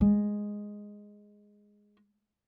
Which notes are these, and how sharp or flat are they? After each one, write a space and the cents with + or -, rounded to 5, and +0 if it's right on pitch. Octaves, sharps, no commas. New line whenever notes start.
G#3 -5